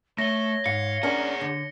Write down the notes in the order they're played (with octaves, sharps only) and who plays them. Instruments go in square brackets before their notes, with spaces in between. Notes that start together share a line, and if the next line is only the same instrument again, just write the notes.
[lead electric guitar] A3 [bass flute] C#5 [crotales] A#6 G7
[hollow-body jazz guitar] G#2 [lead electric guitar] F5 [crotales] C#7
[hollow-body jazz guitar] C#4 D4 A#4 [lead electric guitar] G#4 F#5
[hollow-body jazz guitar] D3